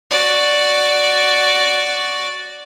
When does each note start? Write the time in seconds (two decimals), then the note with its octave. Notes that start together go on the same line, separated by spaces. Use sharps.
0.11 F#4 D5